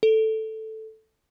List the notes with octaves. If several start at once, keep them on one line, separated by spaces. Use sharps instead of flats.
A4